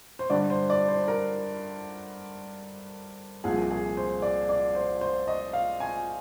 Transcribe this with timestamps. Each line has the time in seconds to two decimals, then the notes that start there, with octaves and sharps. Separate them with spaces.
0.19 C5
0.30 G2 D3 G3 D5
0.50 C5
0.70 D5
0.89 C5
1.08 A#4
3.44 C2 A#2 F3 G#4
3.71 G#4
3.97 C5
4.22 D5
4.49 D5
4.75 C5
5.01 C5
5.28 D#5
5.53 F5
5.80 G#5